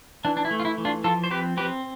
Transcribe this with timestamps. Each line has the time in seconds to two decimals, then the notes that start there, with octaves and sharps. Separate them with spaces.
0.25 E3 D4
0.37 D4
0.45 E4
0.51 A3
0.60 F4
0.65 E4
0.78 E3
0.85 D4 F4
1.04 F3 F4 A4
1.24 C5
1.31 C4 G4 B4
1.57 C4 G4 B4